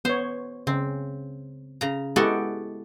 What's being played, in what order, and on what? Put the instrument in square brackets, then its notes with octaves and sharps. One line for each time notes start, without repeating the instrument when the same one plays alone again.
[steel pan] B3 C#5 [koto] C5
[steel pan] C#3 [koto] C4
[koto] C#3 A#5
[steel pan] G#3 E4 G4 [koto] B3 F#4 A4